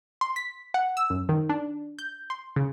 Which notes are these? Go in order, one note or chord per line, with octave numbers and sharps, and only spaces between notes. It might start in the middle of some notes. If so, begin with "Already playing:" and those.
C6
B6
F#5
E6
F#2
D#3
D4
G6
C6
C#3